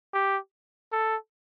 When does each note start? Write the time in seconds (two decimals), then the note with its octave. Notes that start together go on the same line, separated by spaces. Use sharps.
0.14 G4
0.92 A4